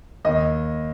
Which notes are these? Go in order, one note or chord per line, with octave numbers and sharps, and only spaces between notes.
D#2 D#5